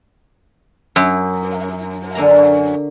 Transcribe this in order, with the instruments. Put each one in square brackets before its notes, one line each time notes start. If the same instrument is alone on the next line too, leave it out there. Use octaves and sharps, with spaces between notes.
[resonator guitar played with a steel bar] F#2
[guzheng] D3 A#3 A#5